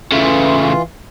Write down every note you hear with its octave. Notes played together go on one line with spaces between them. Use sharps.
C#3 E3 A3 F4